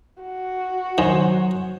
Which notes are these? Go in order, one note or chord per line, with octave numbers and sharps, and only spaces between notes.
F#4
D#3 F#3 C5 G#5